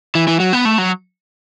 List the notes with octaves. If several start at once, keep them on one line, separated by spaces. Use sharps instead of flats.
E3
E3
F#3
B3
A3
F#3